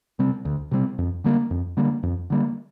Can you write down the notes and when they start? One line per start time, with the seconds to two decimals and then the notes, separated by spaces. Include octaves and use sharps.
0.19 C3 G3 C4
0.45 D2
0.71 C3 G3 C4
0.98 F2
1.24 D3 G3 A#3
1.51 F2
1.77 D3 G3 A#3
2.03 F2
2.30 D3 G3 A#3